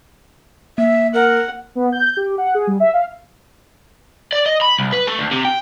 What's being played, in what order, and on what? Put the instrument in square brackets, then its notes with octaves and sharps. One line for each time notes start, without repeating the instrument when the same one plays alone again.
[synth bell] A#3 [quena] E5
[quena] A#4 [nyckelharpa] F#5
[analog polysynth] B3
G6
G4
F#5
G#4
G3
E5
F5
[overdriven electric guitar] D5
D#5
B5
C2
B4
A3
D2
C3
G5